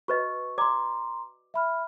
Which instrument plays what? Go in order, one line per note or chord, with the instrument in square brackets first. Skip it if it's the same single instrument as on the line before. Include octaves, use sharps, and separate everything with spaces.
[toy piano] F#4 B4 D#5 [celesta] C#6
[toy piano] D5 D6 [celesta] A#5 C6
[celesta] E5 B5 F6